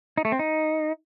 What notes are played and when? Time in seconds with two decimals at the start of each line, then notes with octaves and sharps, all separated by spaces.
0.18 D#4
0.25 A3
0.32 C4
0.39 D#4